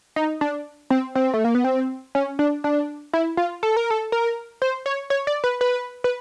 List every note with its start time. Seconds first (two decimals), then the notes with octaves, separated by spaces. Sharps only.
0.16 D#4
0.41 D4
0.90 C4
1.15 C4
1.34 A3
1.45 A#3
1.55 B3
1.64 C4
2.15 C#4
2.39 D4
2.64 D4
3.13 E4
3.37 F4
3.63 A4
3.77 A#4
3.90 A4
4.12 A#4
4.62 C5
4.86 C#5
5.10 C#5
5.27 D5
5.44 B4
5.61 B4
6.04 B4